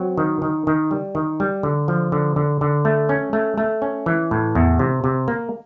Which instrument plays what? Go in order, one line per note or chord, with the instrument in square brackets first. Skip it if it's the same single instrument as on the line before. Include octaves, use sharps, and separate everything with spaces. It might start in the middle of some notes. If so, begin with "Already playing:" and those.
Already playing: [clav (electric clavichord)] F#3 C4
D#3
D#3
D#3
G3
D#3
G3
D3
F3
D3
D3
D3
A3
C#4
A3
A3
C#4
E3
A2
E2
C3
C3
A#3